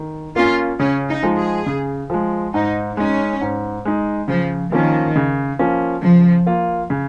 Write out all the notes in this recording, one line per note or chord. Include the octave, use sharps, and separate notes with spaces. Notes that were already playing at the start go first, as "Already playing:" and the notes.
Already playing: D#3
A#3 C#4 F4
C#3 C#4
D#4
F3 G#3
G#4
C#3
F3 G#3
G#2 D#4
G#3 C#4 D#4
G#2
G#3 D#4
C#3 F3
D#3 F3 A#3 C#4
C#3
F3 A#3 C#4
C#3 F3
A#3 F4
C#3